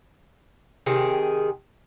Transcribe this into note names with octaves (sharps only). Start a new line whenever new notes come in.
C3 D#3 G#4